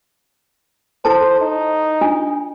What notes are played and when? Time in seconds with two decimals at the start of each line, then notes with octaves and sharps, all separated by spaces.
1.05 E4 A4 C5 A5
1.41 D#4
2.01 D4 F4 G#5